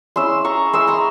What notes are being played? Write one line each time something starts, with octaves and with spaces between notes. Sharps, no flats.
G#3 C#4 E4 C6 E6
A#5 C#6
G#3 E4 C6 E6
A#5 C#6